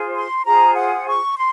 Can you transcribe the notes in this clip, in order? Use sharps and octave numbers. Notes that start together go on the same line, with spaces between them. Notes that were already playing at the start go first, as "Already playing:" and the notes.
Already playing: F4 G#4 C5
C6
F4 G#4 C5 A#5
F#5
C#6
C6